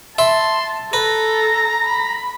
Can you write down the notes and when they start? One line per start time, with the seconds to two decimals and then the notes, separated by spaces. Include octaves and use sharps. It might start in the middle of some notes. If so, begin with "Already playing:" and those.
0.19 E5 A5 C6
0.93 A4 B4 A#5
1.84 B5